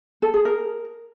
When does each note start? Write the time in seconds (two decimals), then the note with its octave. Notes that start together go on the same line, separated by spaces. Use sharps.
0.22 A4
0.34 G#4
0.45 A#4